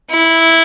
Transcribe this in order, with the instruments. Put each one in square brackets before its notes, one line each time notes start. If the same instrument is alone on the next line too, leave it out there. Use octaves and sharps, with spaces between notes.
[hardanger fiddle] E4